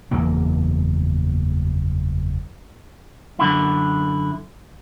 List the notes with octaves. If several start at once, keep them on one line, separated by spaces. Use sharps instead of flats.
F#1 E2 E3 A#3
F#2 D3 E4